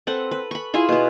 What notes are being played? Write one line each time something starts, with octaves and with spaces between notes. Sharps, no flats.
C4 A4 B4 F#5
B4
B5 C#6
E4 F4 G#4 E5
B2 B3